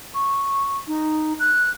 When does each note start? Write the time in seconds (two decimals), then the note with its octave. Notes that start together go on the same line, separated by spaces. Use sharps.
0.14 C#6
0.88 D#4
1.39 F#6